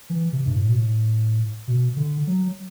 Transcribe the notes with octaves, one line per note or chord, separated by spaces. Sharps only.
E3
C3
G2
A2
B2
A2
B2
D3
F#3